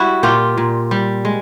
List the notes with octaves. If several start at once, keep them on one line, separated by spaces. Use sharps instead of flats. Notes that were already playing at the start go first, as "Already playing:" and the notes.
Already playing: G3 E4 F#4
A#2 F4 G4
A#2
G3
G#3